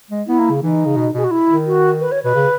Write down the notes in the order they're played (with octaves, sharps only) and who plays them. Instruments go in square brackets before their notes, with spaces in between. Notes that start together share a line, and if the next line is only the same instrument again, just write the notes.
[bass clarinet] G#3
[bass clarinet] B3 [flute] E4
[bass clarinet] A#3
C#3
[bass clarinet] E3 [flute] D#4
[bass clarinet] C#3
B2
[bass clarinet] B2 [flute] G#4
[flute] F#4
E4
[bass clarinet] D#3
[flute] F#4
B4
C#5
[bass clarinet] B2 [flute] B4
[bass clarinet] C#3